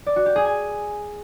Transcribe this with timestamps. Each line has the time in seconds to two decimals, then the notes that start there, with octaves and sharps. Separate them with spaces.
0.07 D5
0.16 F#4
0.26 G4
0.36 G#4
0.45 G#5